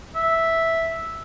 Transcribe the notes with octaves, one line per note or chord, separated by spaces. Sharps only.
E5